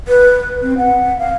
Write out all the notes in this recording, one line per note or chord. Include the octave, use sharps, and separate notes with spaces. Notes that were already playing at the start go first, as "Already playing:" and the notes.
B4
C4
F#5
F5